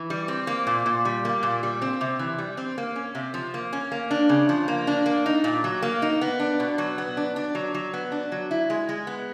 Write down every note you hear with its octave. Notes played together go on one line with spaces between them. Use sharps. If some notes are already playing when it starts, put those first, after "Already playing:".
Already playing: E3
G3
C4
A#3
A#2
A#2
G3
A#3
A#2
G3
C4
C3
E3
G3
C4
A#3
C#4
C3
F3
A#3
C#4
A#3
D4
C#3
F3
A#3
D4
A#3
D#4
A#2
F#3
A#3
D#4
B3
D4
B2
F#3
B3
D4
D4
F#3
F#3
B3
D4
F#3
E4
G#3
G#3
B3